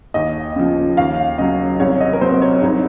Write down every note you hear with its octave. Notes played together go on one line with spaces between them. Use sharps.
D#2 D#5
C#3 F3
D#2 F5
C#3 F#3 D#5
C2 C#5
D#5
A#4
C3 F#3 C5
C#5
C2 D#4